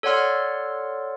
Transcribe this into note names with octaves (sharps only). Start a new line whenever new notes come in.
A4 C#5 D5 F#5 C6 F6